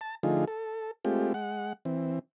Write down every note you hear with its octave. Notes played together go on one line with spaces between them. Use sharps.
A5
D3 F3 A3 D#4 F4 G#4
A4
G#3 A3 C4 F4 G4
G#3 F#5
E3 C4